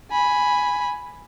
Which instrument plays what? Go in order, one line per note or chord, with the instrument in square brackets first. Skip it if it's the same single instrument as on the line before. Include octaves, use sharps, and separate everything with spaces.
[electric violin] G#5 B5